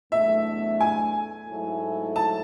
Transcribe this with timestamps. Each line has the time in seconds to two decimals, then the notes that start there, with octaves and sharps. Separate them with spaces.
0.12 E2 B2 F#3 A3 D4 E5
0.81 G#5
1.48 G#2 F#3 A3 E4 A4
2.16 A5